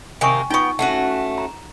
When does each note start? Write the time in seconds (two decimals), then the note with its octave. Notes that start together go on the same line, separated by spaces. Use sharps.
0.21 C3 D#3 A#3 G5 G#5 C#6
0.50 B3 D#4 F4 G5 C#6
0.79 A3 C#4 F#4 F#5
1.38 A#5